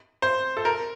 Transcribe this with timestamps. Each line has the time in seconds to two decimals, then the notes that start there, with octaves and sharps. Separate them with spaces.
0.22 C5
0.57 A4
0.65 A#4